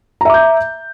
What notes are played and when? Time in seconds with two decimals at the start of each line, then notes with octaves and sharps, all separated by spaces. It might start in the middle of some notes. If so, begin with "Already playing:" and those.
0.21 A#5
0.25 E5
0.30 D6
0.34 G6